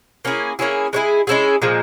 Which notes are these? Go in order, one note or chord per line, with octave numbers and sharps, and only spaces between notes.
A#3 C#4 E4 G#4
A#3 C#4 E4 G#4
G#3 C#4 E4 G#4
G#3 C#4 E4 G#4
A#2 F3 G#3